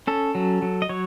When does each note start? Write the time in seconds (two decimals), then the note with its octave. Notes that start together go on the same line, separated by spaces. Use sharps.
0.07 C#4 A4
0.35 F#3
0.62 F#3
0.82 D#5
0.89 F#3 C#5